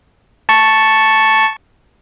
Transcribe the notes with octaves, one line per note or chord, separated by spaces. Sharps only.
A5 C#6